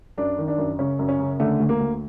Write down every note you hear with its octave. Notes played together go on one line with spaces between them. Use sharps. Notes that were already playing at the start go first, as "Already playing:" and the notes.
F#2 D4
D#3
D4
F#2
C#3 C#4
F#2
C#4
C#3
D3 A3
D2
A#3
D2